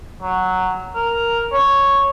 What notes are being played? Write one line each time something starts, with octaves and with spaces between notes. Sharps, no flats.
F#3
A#4
C#5